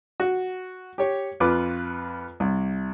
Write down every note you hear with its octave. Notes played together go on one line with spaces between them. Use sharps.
F#4
G4 C#5
F2 F4 B4 D6
C2